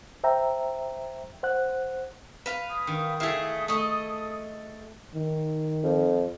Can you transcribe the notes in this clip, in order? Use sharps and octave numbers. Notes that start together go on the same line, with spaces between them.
C5 E5 G5 A#5
C5 F#5 F#6
B4 F5
D#6
D#3
A3 E4 G#4 E5 F5
A3 A4 D#5
D#3
F2